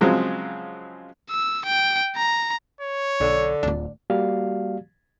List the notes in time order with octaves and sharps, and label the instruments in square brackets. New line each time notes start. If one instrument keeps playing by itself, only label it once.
[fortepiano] C#3 F3 F#3 G#3 C4
[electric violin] E6
G5
A#5
[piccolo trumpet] C#5
[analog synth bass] B1 [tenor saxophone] D3
[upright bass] D1 F4 [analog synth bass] D4
[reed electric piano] G3 A#3 F#4 G4 D5 F5